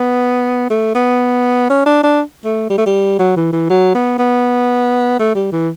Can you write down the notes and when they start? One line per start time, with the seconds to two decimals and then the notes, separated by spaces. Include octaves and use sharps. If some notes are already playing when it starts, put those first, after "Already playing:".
Already playing: B3
0.70 A3
0.95 B3
1.70 C#4
1.86 D4
2.03 D4
2.45 A3
2.70 G3
2.78 A3
2.86 G3
3.19 F#3
3.36 E3
3.53 E3
3.70 F#3
3.95 B3
4.18 B3
5.19 A3
5.35 G3
5.52 E3